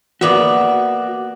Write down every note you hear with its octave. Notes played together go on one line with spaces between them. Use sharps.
A#3 B3 F#4 D5 E5